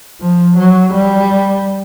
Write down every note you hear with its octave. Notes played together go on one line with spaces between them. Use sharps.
F3
F#3
G3